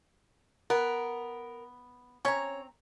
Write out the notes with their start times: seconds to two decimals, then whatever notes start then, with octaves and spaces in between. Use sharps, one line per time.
0.70 B3 A#4
2.25 C4 C#4 C#5 A#5